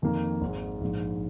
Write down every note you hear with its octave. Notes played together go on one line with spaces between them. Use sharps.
F2 D#3 A#3
G#1 G#2 G#3
A#1 G#2 G#3